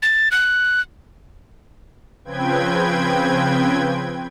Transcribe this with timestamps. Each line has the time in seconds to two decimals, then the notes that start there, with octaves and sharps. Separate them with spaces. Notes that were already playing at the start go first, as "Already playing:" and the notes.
0.02 A6
0.32 F#6
2.25 C#3 F3 C4 B4 G5 G#6